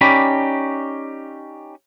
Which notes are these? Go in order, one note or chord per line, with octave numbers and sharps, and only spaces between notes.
C#4 D#4 G4 D5 B5